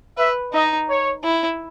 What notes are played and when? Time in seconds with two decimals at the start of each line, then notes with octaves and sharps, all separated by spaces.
0.17 B4 E5
0.53 D#4 D#5
0.88 C#5
1.24 E4